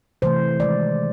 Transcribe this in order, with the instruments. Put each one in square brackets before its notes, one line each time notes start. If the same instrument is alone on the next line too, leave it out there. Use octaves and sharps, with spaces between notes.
[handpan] C3 E3 A3 C5
D#3 G#3 D5